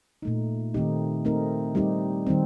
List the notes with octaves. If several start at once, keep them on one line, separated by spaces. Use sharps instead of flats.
A#2 A3 D#4
D#3 A3 C4 D#4 G4
A3 C4 D#4 A#4
G3 C4 D#4 G4
D#3 G3 C4